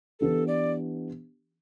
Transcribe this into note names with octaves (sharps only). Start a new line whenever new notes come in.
E3 B3 D4 G4 A4
D5